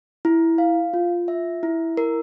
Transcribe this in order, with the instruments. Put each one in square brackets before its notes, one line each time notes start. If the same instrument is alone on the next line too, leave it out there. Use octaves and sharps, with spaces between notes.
[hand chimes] E4
F5
F4
E5
E4
A#4